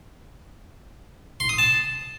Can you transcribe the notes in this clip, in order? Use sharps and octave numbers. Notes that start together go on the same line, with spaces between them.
C6
D#6
A5